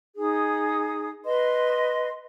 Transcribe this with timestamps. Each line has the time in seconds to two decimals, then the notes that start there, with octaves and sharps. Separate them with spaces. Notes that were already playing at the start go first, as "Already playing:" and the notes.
0.16 D#4 G#4 D#6
1.24 B4 D#5 C6